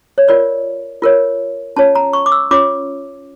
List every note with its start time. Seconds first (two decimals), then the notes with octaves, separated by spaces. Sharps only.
0.18 C#5
0.28 F4 A#4 C#5 D5
1.02 F4 A#4 C#5
1.76 C#4 F4 C#5 A5
1.95 A#5
2.13 C#6
2.26 D6
2.32 E6
2.51 C#4 F4 C#5 D6